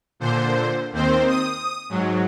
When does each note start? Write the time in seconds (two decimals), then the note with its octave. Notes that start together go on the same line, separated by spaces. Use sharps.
0.20 A#2 D3 C5
0.92 D#2 D#3 C4 C5
1.28 D#6
1.89 G#2 F#3